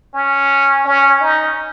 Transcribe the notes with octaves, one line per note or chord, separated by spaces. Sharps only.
C#4
C#4
D#4